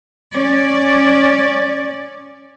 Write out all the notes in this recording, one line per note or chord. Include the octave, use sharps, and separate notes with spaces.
C#4 D5